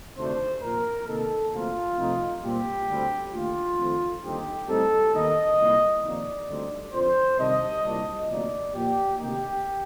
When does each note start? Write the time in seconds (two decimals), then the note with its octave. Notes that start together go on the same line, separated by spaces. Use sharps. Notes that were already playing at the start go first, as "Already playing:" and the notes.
0.17 D2 C3 D#3 A3 D4 C5
0.62 A#2 F3 A#3 A#4
1.07 C3 D#3 A#3 D#4 A4
1.52 D2 C3 F3 A#3 F4
1.97 F2 C3 F3 A3 D#4
2.42 A#2 G3 C4 G4
2.87 D2 D3 G3 C4
3.32 D#2 D3 A3 F4
3.77 F2 D#3 A3 C4 D#4
4.22 D#2 D3 G3 C4 D#4 G4
4.67 A2 G3 C4 D#4 A4
5.13 D#2 D#3 A#3 D#4 D#5
5.57 C2 A#2 G3 A#3
6.03 F2 C3 D#3 A#3 D#4 D5
6.48 D2 D3 G3 C4 D#4
6.93 F2 D3 F3 C5
7.38 C3 D#3 G3 D4 D#5
7.84 C2 A#2 G3 D4
8.28 D2 C3 F3 A#3 D#4 D5
8.73 A#2 F3 A#3 G4
9.18 D2 C3 D#3 A#3 D#4 G4